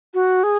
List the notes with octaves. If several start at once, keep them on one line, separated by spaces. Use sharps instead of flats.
F#4
G#4